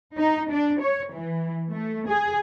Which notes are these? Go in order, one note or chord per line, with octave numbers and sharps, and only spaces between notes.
D#4
D4
C#5
E3
A3
G#4